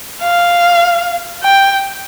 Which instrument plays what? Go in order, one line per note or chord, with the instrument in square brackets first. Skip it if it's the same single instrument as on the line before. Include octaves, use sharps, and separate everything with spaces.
[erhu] F5
G5